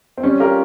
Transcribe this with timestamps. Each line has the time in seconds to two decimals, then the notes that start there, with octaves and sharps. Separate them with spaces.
0.17 C4
0.23 G3 C#4
0.40 C#4 F4 G4 A#4